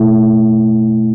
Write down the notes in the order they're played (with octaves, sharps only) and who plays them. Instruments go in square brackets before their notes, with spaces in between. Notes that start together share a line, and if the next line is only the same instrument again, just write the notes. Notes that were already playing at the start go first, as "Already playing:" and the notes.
Already playing: [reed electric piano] B2 A3 E4